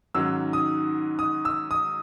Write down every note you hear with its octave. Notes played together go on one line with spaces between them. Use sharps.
G#2 D#3 F#3 C#4 E6
D#6
D#6
E6
D#6